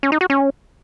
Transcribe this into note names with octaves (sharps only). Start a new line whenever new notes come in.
C#4
D#4
F#4
C#4